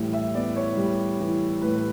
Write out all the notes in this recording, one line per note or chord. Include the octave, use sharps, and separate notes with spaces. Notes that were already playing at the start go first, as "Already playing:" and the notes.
Already playing: A2 E3 G3
E5
B3 D5
C#5
G3
E3
A2 B4
B4